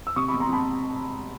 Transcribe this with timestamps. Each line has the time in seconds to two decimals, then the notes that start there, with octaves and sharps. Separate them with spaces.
0.07 E6
0.16 C3 C#6 D#6
0.28 B5 C#6
0.32 E2
0.40 A#5 C6
0.49 C3 A5 B5